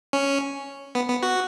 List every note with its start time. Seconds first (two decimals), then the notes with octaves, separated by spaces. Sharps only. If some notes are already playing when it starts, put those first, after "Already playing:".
0.13 C#4
0.95 B3
1.10 B3
1.23 F#4